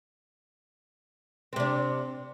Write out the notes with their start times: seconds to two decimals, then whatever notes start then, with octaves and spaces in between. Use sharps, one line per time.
1.53 C4
1.56 C3
1.60 D4